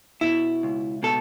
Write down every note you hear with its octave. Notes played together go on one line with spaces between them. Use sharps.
B2 E4
C#2
B2 A4